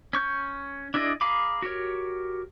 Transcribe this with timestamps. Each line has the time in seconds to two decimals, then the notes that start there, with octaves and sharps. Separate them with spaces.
0.13 C#4 C#6 G6
0.94 D4 E4 G#4 D5 D#5
1.21 G#4 F5 A#5 B5 D6
1.62 F#4 G4 A#4 C#5